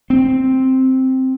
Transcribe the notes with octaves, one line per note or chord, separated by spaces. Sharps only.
C4